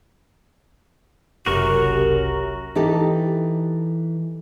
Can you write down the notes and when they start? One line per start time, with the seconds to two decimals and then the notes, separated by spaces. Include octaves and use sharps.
1.46 F#1 C2 F#2 F#4 G4 A#4 C#6
2.75 E3 D#4 G4 A4